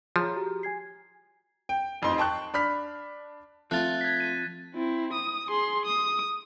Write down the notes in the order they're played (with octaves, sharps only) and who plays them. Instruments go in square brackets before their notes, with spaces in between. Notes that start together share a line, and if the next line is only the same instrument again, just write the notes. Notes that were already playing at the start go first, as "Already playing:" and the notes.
[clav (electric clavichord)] F3 [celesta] G#4 C#5 A#5
[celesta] F#4 G4 A#5
G#5 G#6 C7
[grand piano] G5
A1 F2 D#4 C6
G5 A5 C#6 F#6
D4 B5 F6 B6
[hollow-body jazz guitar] F3 C4 [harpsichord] A3 F4 [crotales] F#6 A6
[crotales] G#6 B6
D#7
[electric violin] C4 E4
D#6
G#4 C6
D#6